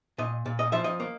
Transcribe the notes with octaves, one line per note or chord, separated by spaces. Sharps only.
A#2 D#5
A#2
D#5
F3 E5
D#5
A#3